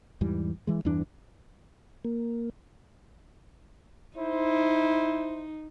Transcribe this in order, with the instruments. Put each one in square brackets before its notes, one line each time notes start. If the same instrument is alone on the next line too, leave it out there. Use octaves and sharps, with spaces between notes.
[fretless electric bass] E2 G#2 E3 G3
E3 G#3
E2 G2 E3 D4
[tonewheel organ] A#3
[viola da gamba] D#4 [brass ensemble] E4 C5